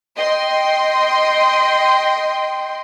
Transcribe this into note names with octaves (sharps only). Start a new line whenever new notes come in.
D#5 G5 C6